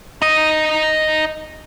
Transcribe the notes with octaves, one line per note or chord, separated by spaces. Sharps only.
D#4 D#5